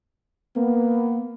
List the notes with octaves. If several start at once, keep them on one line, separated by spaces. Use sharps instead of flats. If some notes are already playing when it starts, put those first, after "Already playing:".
A#3 B3